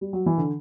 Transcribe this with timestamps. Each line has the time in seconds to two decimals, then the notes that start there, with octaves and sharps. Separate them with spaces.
0.01 G3
0.13 F#3
0.26 E3
0.38 D3